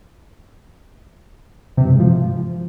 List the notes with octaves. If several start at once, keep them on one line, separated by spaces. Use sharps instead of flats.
C3
G2
G#2
F3